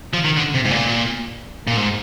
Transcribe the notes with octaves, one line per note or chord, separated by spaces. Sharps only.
F3
D#3
D3
C3
G#2
A#2
A#2
G#2